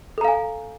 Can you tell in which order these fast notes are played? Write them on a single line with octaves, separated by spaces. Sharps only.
A4 A#5 F5 G#5